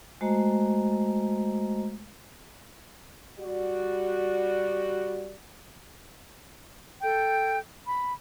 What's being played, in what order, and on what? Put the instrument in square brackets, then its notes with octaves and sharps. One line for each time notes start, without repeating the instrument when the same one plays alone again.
[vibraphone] G#3 A3 F#4 C5 D#5 A#5
[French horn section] G3 F#4 D5
[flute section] A4 G5 G6
B5